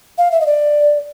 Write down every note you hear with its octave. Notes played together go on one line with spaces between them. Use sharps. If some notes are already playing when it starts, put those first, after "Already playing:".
F5
E5
D#5
D5